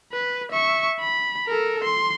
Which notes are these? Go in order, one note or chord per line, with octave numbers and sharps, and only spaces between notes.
B4
E5 C#6
B5
A4 A#4
C6